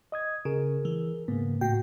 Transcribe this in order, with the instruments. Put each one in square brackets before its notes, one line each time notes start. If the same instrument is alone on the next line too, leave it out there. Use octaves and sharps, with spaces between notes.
[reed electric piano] D#5 D#6 G#6
[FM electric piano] C#3 [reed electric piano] G#4 A#4
[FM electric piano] E3
[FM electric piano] G#2 [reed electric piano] C#3 A#3 B3
[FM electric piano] A2 G5 [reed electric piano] F#4